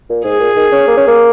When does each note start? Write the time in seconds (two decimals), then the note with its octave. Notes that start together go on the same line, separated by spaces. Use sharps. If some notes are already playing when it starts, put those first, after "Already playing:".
0.10 A#2
0.24 G#2 G#4
0.40 A#2
0.56 D#3
0.72 C#4
0.87 A#3
0.97 C#4
1.07 A#3